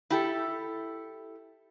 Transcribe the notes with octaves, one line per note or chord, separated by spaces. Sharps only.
E4 G4 A4